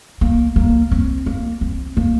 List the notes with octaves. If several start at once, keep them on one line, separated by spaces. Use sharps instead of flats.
A#3
A#3
C4
A#3
C4
A#3